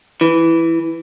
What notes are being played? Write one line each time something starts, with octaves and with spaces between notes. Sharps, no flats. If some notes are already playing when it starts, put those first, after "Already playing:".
E3